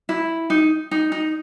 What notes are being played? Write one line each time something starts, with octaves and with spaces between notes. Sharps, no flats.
E4
D#4
D#4
D#4